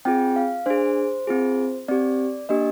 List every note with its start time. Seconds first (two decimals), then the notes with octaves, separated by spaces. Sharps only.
0.05 C4 F4 G#4 G5
0.36 F5
0.66 D4 G#4 C5
1.27 C4 F4 G#4
1.88 C4 G4 D5
2.49 A#3 D4 G4 D#5